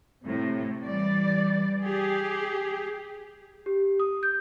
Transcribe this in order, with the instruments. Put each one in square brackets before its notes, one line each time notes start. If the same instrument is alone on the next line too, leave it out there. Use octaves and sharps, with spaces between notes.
[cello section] A2 C3
E3 G3 D5
G4 G#4
[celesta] G4
D#6
G6